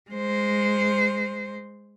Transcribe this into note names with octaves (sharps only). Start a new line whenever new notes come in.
G#3 C5